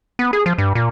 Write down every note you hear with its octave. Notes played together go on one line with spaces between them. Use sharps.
B3
G#4
F3
G2
A#2